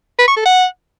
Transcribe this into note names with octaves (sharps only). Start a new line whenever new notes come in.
B4
C#6
A4
F#5